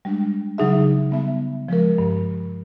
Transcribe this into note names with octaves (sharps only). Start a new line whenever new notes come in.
G3 G#3 D4
C#3 F#3 D#4 G#4 E5
G3 B3 E5
F3 G#3 A#4
G2